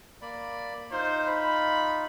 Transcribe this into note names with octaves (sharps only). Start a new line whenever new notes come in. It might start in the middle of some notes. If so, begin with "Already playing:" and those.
A#3 D5 B5
D#4 F4 C5
B5